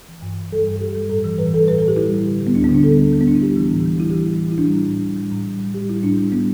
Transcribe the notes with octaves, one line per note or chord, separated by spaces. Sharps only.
E3
G2
G2
G3 A4
G2
A4
G2 G4
G3
A2 A4
E3
A2 B4
G3 A4
A2 B4
A4
A2
G4
G3 E4
G3
D3
G3
B3
D2 D4
B3
D3
D4
G3 A4
D2
G3
B3
D2 D4
E4
G3 G4
E3
A2
G3
E3 E4
G4
E3 E4
E3
E3
E4
G3 D4
A2
A2
G3
G3
A2
G3
G3
G3 G4
G3 E4
A2 D4
G3
G3 B3